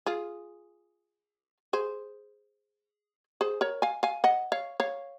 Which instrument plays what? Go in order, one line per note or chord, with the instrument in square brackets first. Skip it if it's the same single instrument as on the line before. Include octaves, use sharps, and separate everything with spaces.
[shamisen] F4 G#4
G#4 C5
G#4 C5
A#4 C#5
F5 G#5
F5 G#5
D#5 F#5
C#5 F5
C#5 F5